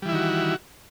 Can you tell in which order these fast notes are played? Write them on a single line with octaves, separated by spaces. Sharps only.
G3 E3 E4 D#3 F#4